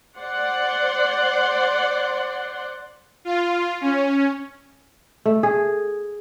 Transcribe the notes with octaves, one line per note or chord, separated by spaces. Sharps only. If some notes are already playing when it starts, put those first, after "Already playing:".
C5 D5 F#5 C6
F4
C#4
A3
G#4